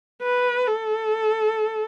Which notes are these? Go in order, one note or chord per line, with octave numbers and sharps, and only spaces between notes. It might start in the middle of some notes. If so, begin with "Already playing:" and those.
B4
A4